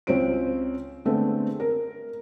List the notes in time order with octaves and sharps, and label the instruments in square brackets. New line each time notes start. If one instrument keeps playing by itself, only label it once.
[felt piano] C#2 C4 C5 C#5 D7
D3 G#3 A3 B3 C4
A#4